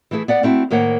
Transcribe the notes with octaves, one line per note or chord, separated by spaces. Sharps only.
E3 A3 E4 G#4
B3 D5 F#5
A3 C4 E4 F#4
A2 D#3 A#3 C5 C#5 F#5